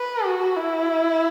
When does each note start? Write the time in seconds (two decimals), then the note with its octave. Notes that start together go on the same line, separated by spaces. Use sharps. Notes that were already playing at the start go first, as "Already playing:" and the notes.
Already playing: B4
0.25 F#4
0.56 E4